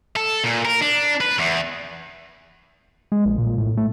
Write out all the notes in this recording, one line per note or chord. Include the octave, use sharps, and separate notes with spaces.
A4
A#2
A#4
D4
B4
E2
G#3
A#1
A#2
A2
A3